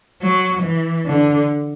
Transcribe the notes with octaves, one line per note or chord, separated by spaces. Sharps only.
F#3
E3
D3